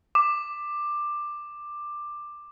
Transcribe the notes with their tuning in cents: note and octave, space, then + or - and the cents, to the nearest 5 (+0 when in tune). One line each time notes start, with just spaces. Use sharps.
D6 +15